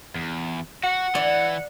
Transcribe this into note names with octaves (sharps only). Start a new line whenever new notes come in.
E2
F#4 F#5
E3 D5